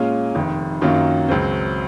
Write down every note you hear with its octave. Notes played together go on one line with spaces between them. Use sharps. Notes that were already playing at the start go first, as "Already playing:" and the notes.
Already playing: A#2 G#3 C#4 F4
F1 F2 D#3
F#2 D#3 F#3 A#3 F4
C#2 C#3 F#3 C4